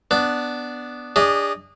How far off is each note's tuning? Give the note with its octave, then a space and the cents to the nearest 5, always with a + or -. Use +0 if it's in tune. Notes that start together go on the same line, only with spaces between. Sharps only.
B3 +0 D4 +0
D4 -20 G#4 -35 D#5 -15